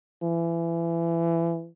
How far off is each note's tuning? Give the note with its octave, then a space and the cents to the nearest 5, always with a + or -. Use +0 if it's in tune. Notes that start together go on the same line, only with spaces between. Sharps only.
E3 +25